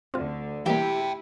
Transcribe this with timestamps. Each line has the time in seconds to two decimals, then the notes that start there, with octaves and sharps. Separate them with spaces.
0.14 D2 D3 C4 F4
0.66 E3 G3 A#3 E4 G4 E5 G5